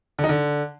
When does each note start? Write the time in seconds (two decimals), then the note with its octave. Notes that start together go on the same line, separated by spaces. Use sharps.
0.19 D3
0.24 D#4
0.29 D3